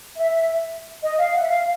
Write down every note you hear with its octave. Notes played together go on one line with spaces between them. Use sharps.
E5
D#5
F5
F#5
E5
F5